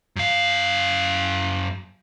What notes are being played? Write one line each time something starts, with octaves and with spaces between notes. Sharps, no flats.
F#2 F5